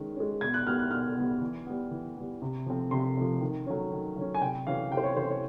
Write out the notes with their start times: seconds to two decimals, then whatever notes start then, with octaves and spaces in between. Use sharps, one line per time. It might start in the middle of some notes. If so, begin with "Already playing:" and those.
Already playing: D#3 G#3 C#4
0.16 G#3 C#4
0.41 B2 G#6
0.54 F#6
0.67 G3 B3 F6
0.79 F#6
0.91 B2 F6
1.17 G3 B3
1.41 E3
1.66 G3 B3
1.91 E3
2.17 G3 B3
2.42 C3
2.66 F3 A3 C4
2.91 C3 C6
3.17 F3 A3 C4
3.41 D#3
3.67 F#3 A3 C#4
3.92 D#3
4.16 F#3 A3 C#4
4.34 G#5
4.41 C3 G5
4.67 E3 A3 C#4 F5
4.91 C3 G5
4.97 C5
5.04 C#5
5.16 E3 C5
5.19 A3 C#4
5.30 C#5